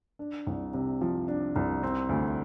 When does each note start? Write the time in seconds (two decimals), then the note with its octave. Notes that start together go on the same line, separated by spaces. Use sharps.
0.19 D4
0.47 C2
0.73 C3
1.01 F3
1.28 D4
1.56 C2
1.83 C4
2.09 D2